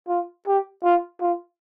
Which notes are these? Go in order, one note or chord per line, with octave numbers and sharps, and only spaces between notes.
F4
G4
F4
F4